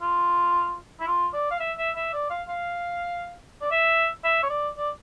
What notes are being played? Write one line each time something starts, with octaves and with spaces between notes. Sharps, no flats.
F4
E4
F4
D5
F5
E5
E5
E5
D5
F5
F5
D5
E5
E5
C#5
D5
D5